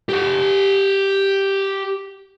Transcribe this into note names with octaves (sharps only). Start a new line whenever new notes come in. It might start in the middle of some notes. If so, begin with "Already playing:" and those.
G4 F#5